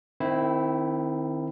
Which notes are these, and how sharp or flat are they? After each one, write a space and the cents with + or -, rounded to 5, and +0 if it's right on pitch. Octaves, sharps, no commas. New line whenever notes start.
D#3 -20 C4 +0 E4 +0